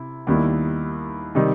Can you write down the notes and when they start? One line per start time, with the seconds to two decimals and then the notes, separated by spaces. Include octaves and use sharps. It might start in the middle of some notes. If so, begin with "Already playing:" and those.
Already playing: C3 E4
0.27 D#2 D#3 G3 B3 E4
1.35 C3 D#3 G3 D#4